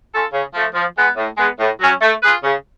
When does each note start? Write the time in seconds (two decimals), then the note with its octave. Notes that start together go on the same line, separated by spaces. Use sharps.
0.12 C#4 F4 A4
0.33 C#3
0.54 F3 A3
0.75 F3
0.96 G#3 B3
1.17 A2
1.38 G#3 B3
1.59 A2
1.81 F#3 C#4
2.02 A3
2.23 F4 G#4 B4
2.43 C#3